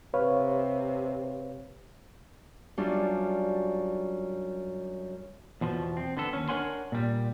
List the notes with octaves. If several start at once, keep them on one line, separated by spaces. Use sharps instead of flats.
C3 B4 C#5 F5
F#2 G3 D4 F4
E2 B2 F3
C4
D3 B3 A4
D#2 C#4
D4 A#4 C#5 F#5 G#5 C6
A#2 G3